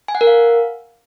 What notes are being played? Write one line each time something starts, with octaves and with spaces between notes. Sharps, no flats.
G#5
F#5
A#4
F5